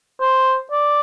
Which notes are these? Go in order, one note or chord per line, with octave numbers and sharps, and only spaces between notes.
C5
D5